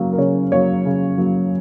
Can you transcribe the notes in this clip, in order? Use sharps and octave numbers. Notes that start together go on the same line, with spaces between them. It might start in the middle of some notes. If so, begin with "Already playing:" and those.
Already playing: C#3 F#3 A#3
A#4
C#3 C#5
F#3 A#3 C#5
C#3
F#3 A#3